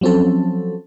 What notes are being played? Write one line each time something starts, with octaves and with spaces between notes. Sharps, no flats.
F3 F#3 C4 C#4 A4